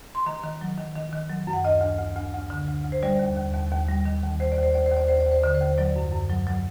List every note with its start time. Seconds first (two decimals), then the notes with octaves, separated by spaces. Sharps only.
0.15 C6
0.26 D#3 A#5
0.44 D#3
0.61 F#3
0.78 D#3
0.95 D#3
1.13 D#3
1.29 F#3
1.47 F#2
1.53 F#5
1.64 D2 D#5
1.81 D2
1.99 D2
2.17 D2
2.33 D2
2.50 D3
2.68 D2
2.85 D2
2.92 C5
3.02 G3 D5
3.19 D#2
3.37 D#2
3.53 D#2
3.71 D#2
3.88 G3
4.05 D#3
4.23 D#2
4.40 D#2 C5
4.52 D5
4.58 D#2
4.63 C5
4.74 D#2 D5
4.86 C5
4.92 D#2 D5
5.08 D#2 C5
5.20 D5
5.26 D#2
5.32 C5
5.43 D3 D5
5.55 C5
5.61 D#2
5.78 F#3 D5
5.96 F#2
6.12 F#2
6.30 F#3
6.47 F#3